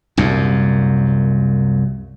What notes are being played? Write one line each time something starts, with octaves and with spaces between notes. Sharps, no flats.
C2 F#2 A#2